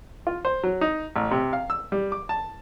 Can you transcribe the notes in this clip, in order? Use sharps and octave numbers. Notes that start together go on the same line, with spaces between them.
F4
C5
F#3
D#4
A1
C3
F5
E6
G3
D6
A5